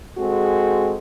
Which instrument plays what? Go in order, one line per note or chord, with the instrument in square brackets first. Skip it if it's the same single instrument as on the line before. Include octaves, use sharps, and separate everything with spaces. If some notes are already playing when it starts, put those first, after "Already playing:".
[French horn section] G#3 C4 F#4 G#4 A4